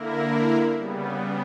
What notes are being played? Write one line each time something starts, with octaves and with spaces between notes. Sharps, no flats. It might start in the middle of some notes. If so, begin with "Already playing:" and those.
Already playing: D3 A#3 E4 A#4
C#3 G3 B3